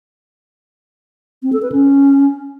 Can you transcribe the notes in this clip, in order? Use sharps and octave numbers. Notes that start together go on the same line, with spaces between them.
C4
A4
B4
C#4